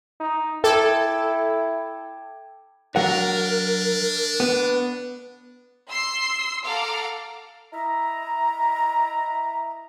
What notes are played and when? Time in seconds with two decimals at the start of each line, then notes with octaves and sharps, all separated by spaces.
0.20 D#4
0.64 E4 A4 G5 D6 G#6
2.96 F#3 D4 A#4 F#5
4.40 B3
5.89 C6 E6 C7
6.65 A4 F5 F#5 A#5 D6 F6
7.73 E4 D#5 E5 A#5